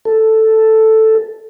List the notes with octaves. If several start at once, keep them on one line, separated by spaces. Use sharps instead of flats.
A4